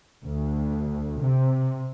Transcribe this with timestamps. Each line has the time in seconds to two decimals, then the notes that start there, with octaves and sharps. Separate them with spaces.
0.25 D2
1.21 C3